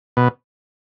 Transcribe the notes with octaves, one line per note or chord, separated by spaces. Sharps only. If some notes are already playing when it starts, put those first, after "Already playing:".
B2